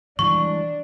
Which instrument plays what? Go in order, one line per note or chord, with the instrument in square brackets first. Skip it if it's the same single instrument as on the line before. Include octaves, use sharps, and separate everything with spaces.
[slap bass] E3 G3 G#3 [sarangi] D4 [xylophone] C#6